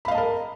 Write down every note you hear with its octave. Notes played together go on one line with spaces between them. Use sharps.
A#4 D#5 F5 A5 B5